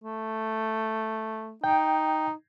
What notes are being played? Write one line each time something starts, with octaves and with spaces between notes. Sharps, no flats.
A3
D#4 G5